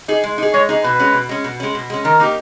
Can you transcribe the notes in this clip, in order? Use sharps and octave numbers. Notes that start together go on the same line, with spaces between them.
D#4 G#4
G#3
D#4 G#4
G#3 C#5
D#4 G#4
B2 B4
G#3 C#4
B2
G#3 C#4
B2
G#3 C#4
B2
G#3 C#4
D#3 A#4
A#3 D#4 G4